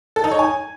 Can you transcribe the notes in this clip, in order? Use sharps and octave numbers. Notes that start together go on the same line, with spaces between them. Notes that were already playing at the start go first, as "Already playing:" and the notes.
A4
D#4
C#5
G#5